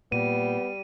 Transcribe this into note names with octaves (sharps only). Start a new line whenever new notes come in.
A#2 G3 B3 D#7